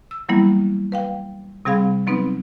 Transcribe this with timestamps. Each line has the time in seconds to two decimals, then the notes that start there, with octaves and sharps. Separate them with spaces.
0.11 E6
0.29 E3 F#3 G3 A#3 B3 E4
0.92 B4 F5 G5
1.65 C3 G3 C4 G#4 F5 B5
2.07 F#3 B3 C4 D#4 B4